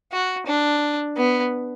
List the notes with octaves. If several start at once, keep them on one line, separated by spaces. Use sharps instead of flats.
F#4
D4
B3